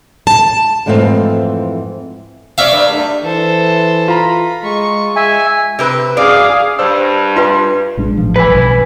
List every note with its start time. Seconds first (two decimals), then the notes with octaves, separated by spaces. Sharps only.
0.27 A5
0.86 F2 G#2 E3 A3 C4 F5
2.58 C4 C#5 D5 E5 F5
2.71 G2 A#3
2.89 G3 A3 D4
3.23 E3 A4 C5
4.08 F4 A#5 B5
4.63 G#3 C#6
5.16 G#3 E5 G#5
5.79 C3 C4 B4
6.17 F#2 G#4 D5 F5
6.79 G2 C5 D5 E6
7.36 F4 B4 A5 C6
7.97 A#1 G#3 D4
8.17 A1 F3
8.36 B4 G#5
8.47 B1 G2